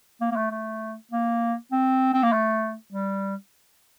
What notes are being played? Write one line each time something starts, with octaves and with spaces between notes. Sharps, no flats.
A#3
A#3
A3
A3
A#3
C4
C4
A#3
A3
G3